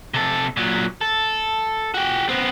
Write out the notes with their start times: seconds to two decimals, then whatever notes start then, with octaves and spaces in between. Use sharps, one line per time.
0.14 C3 A4
0.57 A#2 F#3
1.01 A4
1.94 F#4 G4
2.29 B3 C4